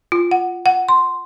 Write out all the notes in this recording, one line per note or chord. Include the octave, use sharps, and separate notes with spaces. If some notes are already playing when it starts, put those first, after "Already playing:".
F4
F#5
F#5
C6